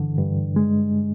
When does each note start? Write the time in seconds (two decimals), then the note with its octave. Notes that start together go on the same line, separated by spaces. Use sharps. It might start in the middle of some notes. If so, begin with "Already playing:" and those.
Already playing: G2 D3 E3
0.18 G2
0.56 G#3